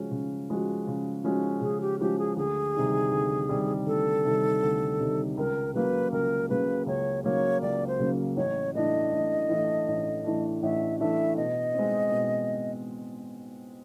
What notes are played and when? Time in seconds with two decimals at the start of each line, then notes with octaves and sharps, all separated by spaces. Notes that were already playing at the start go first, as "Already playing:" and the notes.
Already playing: C#3 F3 G#3 C#4 F#4
0.11 C#3
0.50 F3 G#3 C#4 F#4
0.87 C#3
1.24 F3 G#3 C#4 F#4
1.61 C#3 G#4
1.81 G4
2.00 F3 G#3 C#4 F#4 G4
2.19 G#4
2.36 D2 G#4
2.74 C3 D#3 G3
3.12 D2
3.49 C3 D#3 G3
3.86 D2 A4
4.25 C3 D#3 G3
4.63 D2
4.99 C3 D#3 G3
5.37 C#2 A#4
5.74 C#3 F#3 A#3 B4
6.12 C#2 A#4
6.49 C#3 F#3 A#3 B4
6.87 C#2 C#5
7.24 C#3 F#3 A#3 C#5
7.62 C#2 D5
7.87 C5
7.99 C#3 F#3 A#3
8.37 A1 C#5
8.75 A2 E3 A3 D4 D#5
9.13 A1
9.49 A2 E3 A3 D4
9.88 A1
10.24 A2 E3 A3 D4
10.62 A1 E5
10.99 A2 E3 A3 D4 E5
11.37 B2 D#5
11.74 G#3 C4
12.12 B2